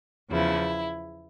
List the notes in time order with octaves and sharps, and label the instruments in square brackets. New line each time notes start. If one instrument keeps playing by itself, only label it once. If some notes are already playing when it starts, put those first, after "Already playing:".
[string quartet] E2 C#3 F3 E4